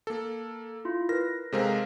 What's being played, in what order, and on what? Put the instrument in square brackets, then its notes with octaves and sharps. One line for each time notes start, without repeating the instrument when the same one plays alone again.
[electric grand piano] A#3 A4
[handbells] E4 F4
[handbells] A#4 B4 [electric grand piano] A#6
[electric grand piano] C3 G#3 A#4 [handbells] A4 C5 F5